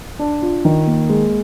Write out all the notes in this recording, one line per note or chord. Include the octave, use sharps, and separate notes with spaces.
D4
F4
D#3
A#3
G#3